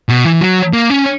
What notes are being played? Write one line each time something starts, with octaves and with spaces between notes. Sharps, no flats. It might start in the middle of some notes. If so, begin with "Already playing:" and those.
B2
E3
F#3
A#3
C#4